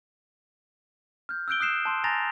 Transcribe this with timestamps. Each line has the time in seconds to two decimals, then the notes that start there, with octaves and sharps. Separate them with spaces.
1.29 F6 G6
1.48 E6 F#6 G6 D7 G7
1.60 D#6 F#6 C7 E7
1.85 A5 C6
2.04 G#5 A#5 A6 A#6 F7